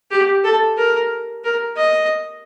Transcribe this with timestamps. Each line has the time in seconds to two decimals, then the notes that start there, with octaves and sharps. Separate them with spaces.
0.11 G4
0.44 A4
0.77 A#4
1.44 A#4
1.77 D#5